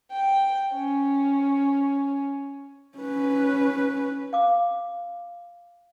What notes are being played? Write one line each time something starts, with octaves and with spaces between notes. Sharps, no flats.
G5
C#4
C#4 B4
F5 D6